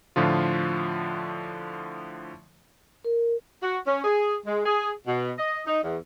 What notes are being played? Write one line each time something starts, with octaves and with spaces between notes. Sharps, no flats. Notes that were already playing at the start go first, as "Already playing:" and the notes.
A2 D3 F3 F4
A#4
F#4
C#4
G#4
G#3
G#4
B2
D#5
D#4
E2